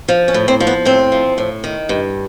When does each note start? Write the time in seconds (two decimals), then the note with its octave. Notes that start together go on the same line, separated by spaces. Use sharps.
0.08 F3
0.28 C#4
0.34 A2
0.48 C4
0.60 F3
0.67 B3
0.85 A2 C4
1.12 F3
1.38 A2
1.64 D#3
1.89 G2